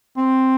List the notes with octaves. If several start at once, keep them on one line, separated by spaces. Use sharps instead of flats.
C4